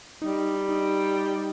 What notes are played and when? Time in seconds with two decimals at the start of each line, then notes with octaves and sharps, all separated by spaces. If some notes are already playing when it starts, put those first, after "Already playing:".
0.22 G3 D#4
0.69 D#4